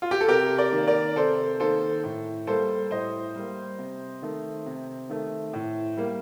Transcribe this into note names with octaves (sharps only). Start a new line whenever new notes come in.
F4
G4
A4
C3 G4 A#4
A#4 D5
D#3 A#3
A#4 D5
C3 A4 C5
D#3 A#3 A4 C5
A2
G3 A#3 A4 C5
A2 C5 D#5
G3 A#3
C3
D#3 A3
C3
D#3 A3
A2
G3 A#3